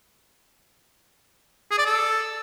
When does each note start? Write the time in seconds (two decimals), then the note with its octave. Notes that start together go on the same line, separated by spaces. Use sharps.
1.71 G#4
1.78 D5
1.86 A4